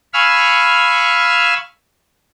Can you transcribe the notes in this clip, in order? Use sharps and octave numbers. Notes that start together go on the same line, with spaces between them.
F5 G#5 B5 C#6 E6 F6